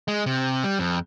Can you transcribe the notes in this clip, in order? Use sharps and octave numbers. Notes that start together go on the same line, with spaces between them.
G#3
C3
G3
F2